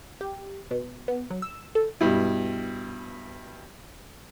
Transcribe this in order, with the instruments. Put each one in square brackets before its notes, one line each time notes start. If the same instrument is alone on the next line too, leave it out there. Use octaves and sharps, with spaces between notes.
[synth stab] G4
B2
B3
F#3
E6
A4
[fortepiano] G2 B2 E4